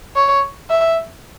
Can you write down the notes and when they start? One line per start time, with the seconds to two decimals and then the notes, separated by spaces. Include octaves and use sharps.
0.16 C#5
0.70 E5